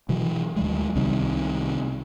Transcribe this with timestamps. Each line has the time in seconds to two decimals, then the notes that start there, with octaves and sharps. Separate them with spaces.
0.09 B2 E3 F#3
0.56 D2 F#3 G#3
0.95 C2 C3 D#3 G3